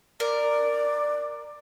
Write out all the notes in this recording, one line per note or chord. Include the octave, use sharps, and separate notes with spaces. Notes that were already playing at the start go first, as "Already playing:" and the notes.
A#4 D5